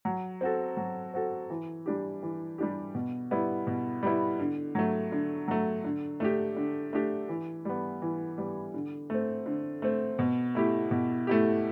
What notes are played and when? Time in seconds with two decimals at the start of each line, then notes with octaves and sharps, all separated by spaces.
0.05 F#3
0.41 C4 F#4 A4
0.77 F#3
1.14 C4 F#4 A4
1.50 E3
1.86 G3 D4 G4
2.23 E3
2.58 G3 D4 G4
2.95 B2
3.31 G3 B3 E4
3.67 B2
4.03 G3 B3 E4
4.39 D3
4.75 F#3 A3
5.12 D3
5.48 F#3 A3
5.84 D3
6.20 A3 D4 G4
6.56 D3
6.93 A3 D4 G4
7.29 E3
7.65 G3 B3
8.02 E3
8.38 G3 B3
8.74 D3
9.10 A3 C4
9.46 D3
9.82 A3 C4
10.19 B2
10.55 A3 E4 G4
10.91 B2
11.27 A3 E4 G4